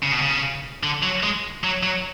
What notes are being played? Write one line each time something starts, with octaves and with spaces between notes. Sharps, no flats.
C#3
B2
C#3
D3
F#3
G#3
F#3
F#3